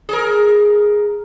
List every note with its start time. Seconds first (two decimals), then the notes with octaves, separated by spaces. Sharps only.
0.09 G#4 A#4